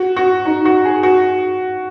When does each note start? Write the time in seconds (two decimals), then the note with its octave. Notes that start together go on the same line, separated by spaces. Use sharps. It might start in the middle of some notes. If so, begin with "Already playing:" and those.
Already playing: F#4
0.16 F#4
0.45 D#4
0.65 F#4
0.85 G#4
1.03 F#4